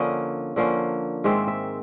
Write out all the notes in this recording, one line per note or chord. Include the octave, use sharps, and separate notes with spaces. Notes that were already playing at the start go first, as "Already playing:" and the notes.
Already playing: D3 F3 A#3 C#4 D#5
D3 F3 A#3 C#4
G#2 D#3 G#3 C4 E5
E5